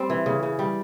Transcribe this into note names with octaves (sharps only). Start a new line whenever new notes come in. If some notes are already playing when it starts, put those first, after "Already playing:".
Already playing: G3 C4
E3
C#3
C#3
G3